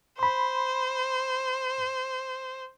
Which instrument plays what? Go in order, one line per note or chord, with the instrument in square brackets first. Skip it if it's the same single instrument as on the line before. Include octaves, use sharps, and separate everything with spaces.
[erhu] C5 [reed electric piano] B5 C6